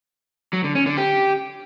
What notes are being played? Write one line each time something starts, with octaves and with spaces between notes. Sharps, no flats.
F#3
D3
C#4
D3
G4